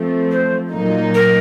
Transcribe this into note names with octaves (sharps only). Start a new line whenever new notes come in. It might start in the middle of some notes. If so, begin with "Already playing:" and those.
Already playing: F3 A3 C4
C5
A#2 F#3 A#3 D#4
A#4